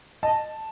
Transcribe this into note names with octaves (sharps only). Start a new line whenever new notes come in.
D#5 A5